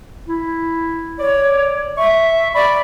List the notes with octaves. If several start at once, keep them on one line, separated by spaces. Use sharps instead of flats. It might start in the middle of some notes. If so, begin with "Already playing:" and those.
E4
C#5 D5
E5 C#6
D5 B5